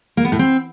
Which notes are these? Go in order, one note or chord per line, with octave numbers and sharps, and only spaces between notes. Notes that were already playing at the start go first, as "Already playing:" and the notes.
A#3
B3
A2
C4